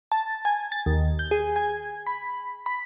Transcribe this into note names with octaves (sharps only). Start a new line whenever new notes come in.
A5
G#5
A6
D#2
G6
G#4
G#5
B5
B5